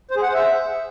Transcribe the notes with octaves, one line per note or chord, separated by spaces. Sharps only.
C5
G#4
F#5
C5
E5